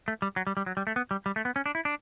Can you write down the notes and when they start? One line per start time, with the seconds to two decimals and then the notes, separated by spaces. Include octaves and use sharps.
0.08 A3
0.22 G3
0.36 F#3
0.47 G3
0.57 G3
0.66 F#3
0.77 G3
0.87 A3
0.96 B3
1.11 G3
1.26 G3
1.36 A3
1.45 B3
1.56 C#4
1.66 D4
1.75 E4
1.85 D4